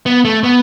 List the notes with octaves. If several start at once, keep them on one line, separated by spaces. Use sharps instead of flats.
B3
A3
B3